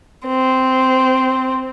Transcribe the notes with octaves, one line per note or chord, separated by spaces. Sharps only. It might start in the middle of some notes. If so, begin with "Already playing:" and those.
C4